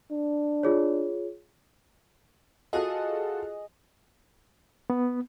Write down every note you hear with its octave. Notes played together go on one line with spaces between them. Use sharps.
D4
F4 G#4 C#5
F4 F#4 G#4 A4 D#5
B3